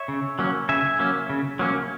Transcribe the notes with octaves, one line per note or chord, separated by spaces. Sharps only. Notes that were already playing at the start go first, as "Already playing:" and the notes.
Already playing: C#5 E5
C#3
F#3 A#3 C#4
C#3 E5 G#5
F#3 A#3 C#4
C#3
F#3 A#3 C#4